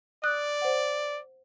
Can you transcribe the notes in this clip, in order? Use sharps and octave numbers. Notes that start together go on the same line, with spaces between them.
D5 D#6 F#6
C5 F#5